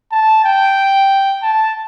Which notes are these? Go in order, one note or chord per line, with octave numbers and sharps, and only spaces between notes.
A5
G5
A5